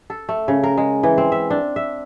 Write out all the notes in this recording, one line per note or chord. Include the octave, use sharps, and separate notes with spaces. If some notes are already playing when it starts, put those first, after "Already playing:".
A4
A3
C#3
A#4
G#3
E3
C4
E5
D4
E5